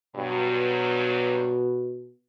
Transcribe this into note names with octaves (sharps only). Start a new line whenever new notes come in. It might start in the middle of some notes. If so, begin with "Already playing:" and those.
G2 B2 F#3